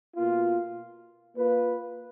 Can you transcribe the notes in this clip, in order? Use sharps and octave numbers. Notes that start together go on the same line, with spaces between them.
B2 A#3 F4
A#3 F4 B4